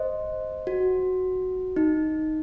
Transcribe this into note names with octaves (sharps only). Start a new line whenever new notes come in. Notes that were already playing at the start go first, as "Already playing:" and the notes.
Already playing: C5 D#5
F#4
D#4